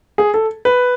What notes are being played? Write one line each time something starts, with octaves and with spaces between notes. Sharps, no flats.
G#4
A4
B4